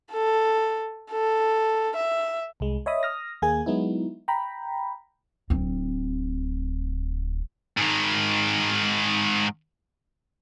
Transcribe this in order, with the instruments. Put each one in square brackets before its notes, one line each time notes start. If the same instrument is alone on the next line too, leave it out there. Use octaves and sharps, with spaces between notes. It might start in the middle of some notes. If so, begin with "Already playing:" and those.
[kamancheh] A4
A4
E5
[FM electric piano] C2 G#3
C#5 D#5 E5 B5 D#6
D#6 F6 A#6
D#2 A#3 G#4 G#5 G#6
F#3 G#3 B3 D#4 E4
G5 A#5 B5
[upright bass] D1 C4
[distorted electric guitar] G#2 D#3